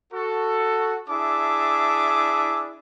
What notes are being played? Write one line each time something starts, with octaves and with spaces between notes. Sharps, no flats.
F#4 A4
D4 E4 G#4 E5 A5 D6